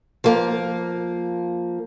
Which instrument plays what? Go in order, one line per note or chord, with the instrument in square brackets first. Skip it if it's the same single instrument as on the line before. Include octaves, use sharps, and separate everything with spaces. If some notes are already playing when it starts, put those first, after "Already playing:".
[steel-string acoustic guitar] F3 A#3